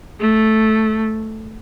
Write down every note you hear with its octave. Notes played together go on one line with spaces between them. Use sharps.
A3